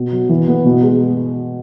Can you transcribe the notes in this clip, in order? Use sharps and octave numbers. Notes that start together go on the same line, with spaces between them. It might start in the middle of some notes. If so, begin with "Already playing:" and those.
Already playing: B2
F#3
E3
B3
B2
G#3